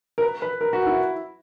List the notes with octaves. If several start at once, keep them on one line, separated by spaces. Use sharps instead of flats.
A#4
B4
B4
A#4
F#4
E4